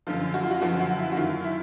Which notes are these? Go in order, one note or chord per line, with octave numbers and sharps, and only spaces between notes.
F#2 D3 F3 F4
F#4
F4
F#4
F#2 D3 F3 F#4
F#4
E4
F#4
F#2 D#3 F4
E4